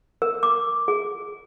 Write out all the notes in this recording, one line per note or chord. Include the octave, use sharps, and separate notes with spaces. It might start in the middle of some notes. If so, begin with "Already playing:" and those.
A#4
D6
G#4